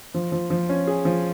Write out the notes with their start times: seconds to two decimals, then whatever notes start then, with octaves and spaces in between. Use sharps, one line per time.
0.14 F3
0.32 F3
0.50 F3
0.69 C#4
0.87 G#4
1.05 F3